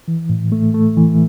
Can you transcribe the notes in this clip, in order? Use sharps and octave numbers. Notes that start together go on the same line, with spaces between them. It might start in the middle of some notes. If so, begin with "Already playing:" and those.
E3
A2
A3
A3
E3